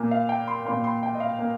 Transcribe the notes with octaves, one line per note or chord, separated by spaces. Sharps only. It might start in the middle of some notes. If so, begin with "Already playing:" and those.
Already playing: A#2 A#3
F5
G5
C6
A#2 A#3 C6
C6
G5
D#5
F5
A#3